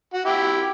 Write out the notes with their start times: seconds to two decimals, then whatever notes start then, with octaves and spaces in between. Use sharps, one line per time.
0.14 F#4
0.25 E4 G4